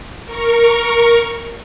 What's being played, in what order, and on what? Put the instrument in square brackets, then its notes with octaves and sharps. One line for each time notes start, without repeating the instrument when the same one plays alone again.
[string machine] A#4 C#6